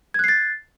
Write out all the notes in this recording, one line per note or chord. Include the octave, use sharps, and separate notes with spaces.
F#6 G#6 A6 C7